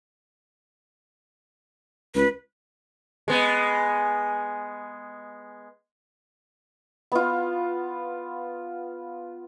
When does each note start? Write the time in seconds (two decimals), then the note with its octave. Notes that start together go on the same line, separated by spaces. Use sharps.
2.15 C#2 B4
3.28 G#3 B3
7.12 B3 F4